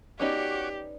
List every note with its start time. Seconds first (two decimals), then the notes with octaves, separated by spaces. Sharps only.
0.19 B3 C#4 D#4 F#4 G4 C#5 D5 D6